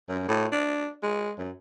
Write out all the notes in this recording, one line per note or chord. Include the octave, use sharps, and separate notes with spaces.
F#2
A2
D4
G#3
F#2